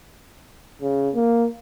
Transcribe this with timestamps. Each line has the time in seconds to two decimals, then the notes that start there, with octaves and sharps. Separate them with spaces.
0.82 C#3
1.15 A#3